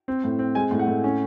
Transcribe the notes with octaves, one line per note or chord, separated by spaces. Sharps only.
C4
A2
C4
G#3 G#5
A2
F#5
A2
C#4